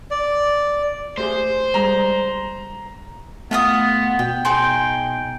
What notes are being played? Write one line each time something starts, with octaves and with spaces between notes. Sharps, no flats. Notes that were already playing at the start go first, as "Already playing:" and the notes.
D5
A3 G4 G#4 C5
G3 G#3 A#5
A3 B3 F4 F5 D#6
B2 G5
D#4 G#4 G5 C6